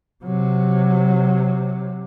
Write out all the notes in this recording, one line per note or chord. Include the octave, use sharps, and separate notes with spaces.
C3 F#3